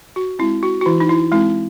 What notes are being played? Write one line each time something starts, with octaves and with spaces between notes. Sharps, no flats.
F#4
G#3 C4 E4
F#4
F#4
E3 E4
D#4
E4
G#3 C4 E4